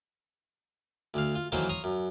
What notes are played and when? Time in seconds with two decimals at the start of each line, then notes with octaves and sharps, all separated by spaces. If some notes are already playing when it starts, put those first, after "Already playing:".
1.14 D2 D3 F5
1.35 F4
1.52 D#3 E3 F#3 A#3 A4 C5
1.69 C#5 A#5 C6 D#6
1.84 F#2